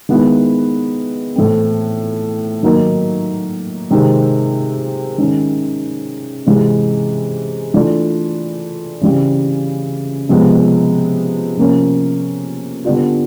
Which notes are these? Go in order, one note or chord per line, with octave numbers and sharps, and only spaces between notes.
D#3 G#3 B3 E4
A2 E3 A3 C4
D#3 F#3 A#3 D#4
C3 D#3 G#3 C4
D#3 G#3 C#4
C3 E3 G#3
E3 A3 D4 F4
C#3 E3 G3 C4
C3 F3 G#3 B3
C3 F3 A#3 C#4
D3 G3 B3 D4 F4